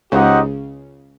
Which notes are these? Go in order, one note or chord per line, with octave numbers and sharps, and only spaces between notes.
C#2 C#3 D#4 G4 C5 D#5 F#5